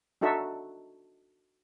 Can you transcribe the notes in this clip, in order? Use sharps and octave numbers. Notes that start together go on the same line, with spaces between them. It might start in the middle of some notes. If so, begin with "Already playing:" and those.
D4 D#4 F#4 A4 E5